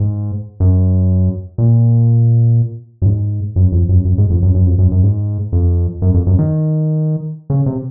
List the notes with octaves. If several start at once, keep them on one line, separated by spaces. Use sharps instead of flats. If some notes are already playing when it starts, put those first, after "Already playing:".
Already playing: G#2
F#2
A#2
F#2
G#2
F#2
F2
F#2
F#2
G#2
F2
F#2
F#2
F2
F#2
F#2
G#2
F2
F#2
F2
F#2
D#3
C#3
C3